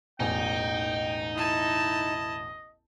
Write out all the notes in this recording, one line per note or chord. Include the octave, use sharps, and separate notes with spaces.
E1 A1 D#4 G5 G#5
E4 D#5 A5